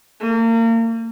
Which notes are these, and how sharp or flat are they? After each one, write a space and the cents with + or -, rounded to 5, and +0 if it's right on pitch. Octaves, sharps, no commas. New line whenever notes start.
A#3 -35